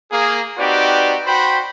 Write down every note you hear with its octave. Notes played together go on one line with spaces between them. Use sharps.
A#3 G#4
C4 D#4 F#4 G4 B4 D5
F#4 C5 G5 B5